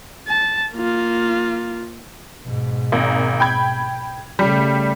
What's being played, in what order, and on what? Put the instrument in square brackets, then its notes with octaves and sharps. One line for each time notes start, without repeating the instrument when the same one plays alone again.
[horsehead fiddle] A5
A#3 F4
[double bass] G#2 B2
[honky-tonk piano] G#1 A#3
G5 B5 G#6
[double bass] C#3 A3 [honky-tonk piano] G3